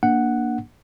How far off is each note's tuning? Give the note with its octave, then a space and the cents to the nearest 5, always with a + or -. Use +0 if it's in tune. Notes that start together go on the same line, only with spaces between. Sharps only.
A#3 +10 D4 +0 F#5 +0